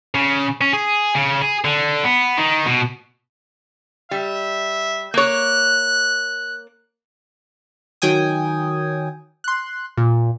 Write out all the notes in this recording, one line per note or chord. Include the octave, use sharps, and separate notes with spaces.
C#3
C#4
G#4
C#3
G#4
D3
B3
D#3
B2
G3 E5
A#3 C#5 F#6
D#3 F#3 G5 G#5 D#6
C6 F#6
A#2